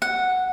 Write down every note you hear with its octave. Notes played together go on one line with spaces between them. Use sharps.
F#5